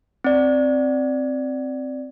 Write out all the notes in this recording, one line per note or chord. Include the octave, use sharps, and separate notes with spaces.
C4 D5